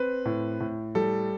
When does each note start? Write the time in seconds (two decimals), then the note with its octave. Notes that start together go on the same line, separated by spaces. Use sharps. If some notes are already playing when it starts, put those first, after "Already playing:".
Already playing: C4 B4
0.25 A2
0.60 A2
0.95 G3 A4